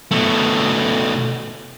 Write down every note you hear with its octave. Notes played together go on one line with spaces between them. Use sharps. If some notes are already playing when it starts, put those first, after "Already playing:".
B2 A3